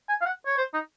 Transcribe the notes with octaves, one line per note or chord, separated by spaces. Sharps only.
G#5
F5
F#5
C#5
C5
D#4